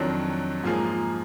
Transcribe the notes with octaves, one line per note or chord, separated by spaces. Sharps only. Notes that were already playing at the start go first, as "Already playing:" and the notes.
Already playing: F2 D#3 F#3 D4
G#2 F3 A#3 F4 G#4